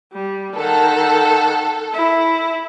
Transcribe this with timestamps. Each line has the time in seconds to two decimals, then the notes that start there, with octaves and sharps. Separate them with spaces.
0.13 G3
0.56 D#3 A4 F#5
1.93 E4